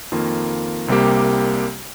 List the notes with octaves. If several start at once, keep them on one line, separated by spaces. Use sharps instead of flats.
F2 D#3 A#3 F4
C2 C3 G3 A#3 G4